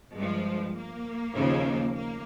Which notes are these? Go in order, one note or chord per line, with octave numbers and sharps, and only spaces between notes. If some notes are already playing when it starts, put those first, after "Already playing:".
G2 F3 G#3
A#3
D#2 C#3 F3
A#3